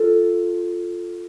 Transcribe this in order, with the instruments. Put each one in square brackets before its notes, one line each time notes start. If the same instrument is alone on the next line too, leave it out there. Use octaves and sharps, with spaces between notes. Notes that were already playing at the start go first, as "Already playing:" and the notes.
Already playing: [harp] F4 A4